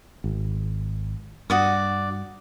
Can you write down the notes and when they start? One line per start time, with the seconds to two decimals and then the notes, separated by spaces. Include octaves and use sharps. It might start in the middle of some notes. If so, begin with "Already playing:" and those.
0.24 G#1
1.50 G2 F#4 D5 D#6